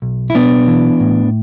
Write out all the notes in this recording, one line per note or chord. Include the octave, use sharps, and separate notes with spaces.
B1
E4
B1 B3 D4
E3
A2